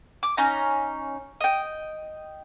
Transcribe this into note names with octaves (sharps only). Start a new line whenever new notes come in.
D6
C#4 D#4 A#5
D#5 G5